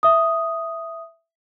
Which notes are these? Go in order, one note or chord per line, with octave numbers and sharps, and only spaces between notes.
E5 D#6